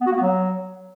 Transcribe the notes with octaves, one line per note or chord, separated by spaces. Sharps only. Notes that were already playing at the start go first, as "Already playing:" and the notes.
B3
F#4
A#3
B3
F#3